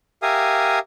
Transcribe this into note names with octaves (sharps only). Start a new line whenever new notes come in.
G4 A#4 E5 F5 G#5 D#6